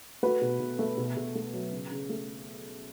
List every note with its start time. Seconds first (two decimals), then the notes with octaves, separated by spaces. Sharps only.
0.23 A3 F#4 B4
0.41 B2
0.60 B2
0.79 A3
0.97 B2
1.16 B2
1.35 A3
1.53 F#3
1.72 C#3
1.91 C#3
2.09 A3